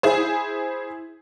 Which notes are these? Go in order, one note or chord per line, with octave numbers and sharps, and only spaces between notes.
E4 G#4 C5